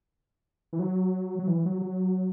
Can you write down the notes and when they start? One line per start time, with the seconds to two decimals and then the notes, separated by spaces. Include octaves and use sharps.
0.73 E3
0.79 F#3
1.39 F#3
1.48 E3
1.65 F#3
1.82 F#3